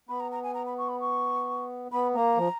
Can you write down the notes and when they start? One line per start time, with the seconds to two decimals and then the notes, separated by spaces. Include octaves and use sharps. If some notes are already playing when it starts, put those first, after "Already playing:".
0.09 B3 B5
0.20 A#5
0.32 A#5
0.43 G#5
0.54 A#5
0.66 B5
0.78 C#6
0.89 B5
1.00 C#6
1.92 B3 B5
2.14 A#3 A#5
2.37 F3